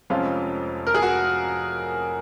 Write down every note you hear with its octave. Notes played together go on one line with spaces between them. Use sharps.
F1 F2 F3 G#3 C#4 F4
A#4
G#4
F#4